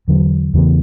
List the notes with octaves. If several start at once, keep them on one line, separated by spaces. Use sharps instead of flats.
E2 D3 F#3
E2 C#3 E3 B3